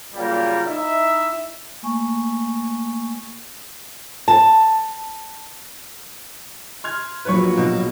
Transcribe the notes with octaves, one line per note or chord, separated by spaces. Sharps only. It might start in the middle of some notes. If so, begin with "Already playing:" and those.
A#2 C#3 F#3 G3 A#3
D#4 E4 D#5 E5
A3 A#3 G#5 C#6
A5
C6 F6 G#6
A#1 F#3 B4 C#5 C#6
B2